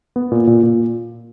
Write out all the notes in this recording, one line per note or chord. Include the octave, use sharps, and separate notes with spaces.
B3
A#2
A#2
A#2